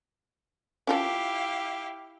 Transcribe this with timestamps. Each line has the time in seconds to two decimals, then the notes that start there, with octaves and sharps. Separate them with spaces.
0.87 C#4 E4 F4 G4 A4 F5